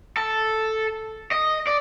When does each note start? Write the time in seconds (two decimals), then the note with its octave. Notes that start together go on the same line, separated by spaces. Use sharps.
0.17 A4
1.31 D#5
1.67 D5